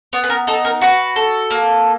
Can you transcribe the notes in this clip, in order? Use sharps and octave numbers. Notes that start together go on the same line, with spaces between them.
B3
B4
A#4
D#4 A4
A#4
F#4 B4
A4
A#3